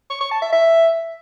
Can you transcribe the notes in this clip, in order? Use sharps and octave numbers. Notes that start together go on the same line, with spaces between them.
C#6
C#6
A5
E5
E5